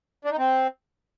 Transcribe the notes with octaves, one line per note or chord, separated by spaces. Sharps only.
D4
D#4
C4